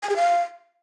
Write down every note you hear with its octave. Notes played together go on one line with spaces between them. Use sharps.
G#5
G#4
F5